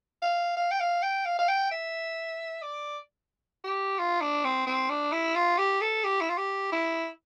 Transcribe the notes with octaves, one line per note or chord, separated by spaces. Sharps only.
F5
F5
G5
F5
G5
F5
F5
G5
E5
D5
G4
F4
D4
C4
C4
D4
E4
F4
G4
A4
G4
E4
F4
G4
E4